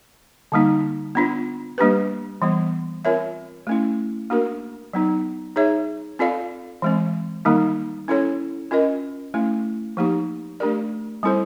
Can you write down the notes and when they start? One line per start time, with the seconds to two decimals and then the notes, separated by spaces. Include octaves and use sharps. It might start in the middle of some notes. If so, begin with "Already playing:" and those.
0.52 D3 G3 A#3 D#4
1.15 B3 D4 F4
1.78 G3 A#3 D4 G4 B4
2.42 E3 G3 B3
3.05 C4 F4 A#4 C#5 E5
3.67 A3 C#4 E4
4.30 A#3 D4 F#4 A#4
4.93 F#3 B3 D#4
5.56 D#4 G#4 C#5 E5
6.19 C4 F4 A4 D5 F5
6.82 E3 G#3 C4
7.45 D#3 G3 A#3 D#4
8.08 C#4 E4 A4 C#5
8.71 C#4 F4 A#4 D#5
9.34 A3 C#4 E4
9.97 F3 A#3 D#4 G4
10.60 A3 D4 G4 A#4 D5
11.23 G3 C4 E4 A4 C5